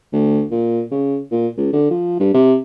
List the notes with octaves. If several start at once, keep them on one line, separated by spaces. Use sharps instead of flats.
D2
A#2
C#3
A#2
C#2
D3
F3
G2
C3